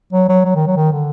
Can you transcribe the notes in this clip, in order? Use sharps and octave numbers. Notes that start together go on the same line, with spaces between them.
F#3
F#3
F#3
D#3
F#3
D#3
D3